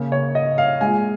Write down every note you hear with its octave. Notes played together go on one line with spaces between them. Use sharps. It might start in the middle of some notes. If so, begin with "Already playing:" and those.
Already playing: C#3 A#3
C#5
D#5
F5
A#2 G#3 G#5